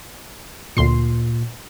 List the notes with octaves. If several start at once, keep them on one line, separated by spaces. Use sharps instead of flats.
D2 A#2 C6 C7